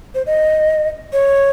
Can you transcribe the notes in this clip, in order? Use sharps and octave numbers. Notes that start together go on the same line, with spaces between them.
C5
D#5
C#5